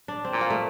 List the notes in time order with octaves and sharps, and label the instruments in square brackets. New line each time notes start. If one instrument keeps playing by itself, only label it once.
[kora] D4
C4
[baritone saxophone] A#2
[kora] A#3
A3